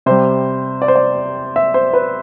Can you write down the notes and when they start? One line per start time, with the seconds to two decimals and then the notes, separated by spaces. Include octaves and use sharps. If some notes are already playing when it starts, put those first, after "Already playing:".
0.06 C3 G3 C5
0.82 D5
0.88 C5
0.96 D5
1.56 E5
1.74 C5
1.93 B4